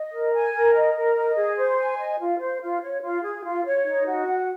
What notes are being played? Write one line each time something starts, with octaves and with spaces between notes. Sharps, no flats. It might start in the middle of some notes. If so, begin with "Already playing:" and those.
Already playing: D#5
A#4
G#5
A#4
D#5
A#4
D#5
G#4
C5
G#5
D#5
F4
C5
F4
C#5
F4
G#4
F4
C#5
D#4
F#4
F#5